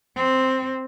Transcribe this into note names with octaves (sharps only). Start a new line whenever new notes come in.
C4